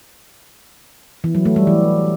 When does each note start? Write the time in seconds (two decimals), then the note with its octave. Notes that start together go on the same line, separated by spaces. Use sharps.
1.24 E3
1.35 F#3
1.45 A3
1.56 G3
1.67 E3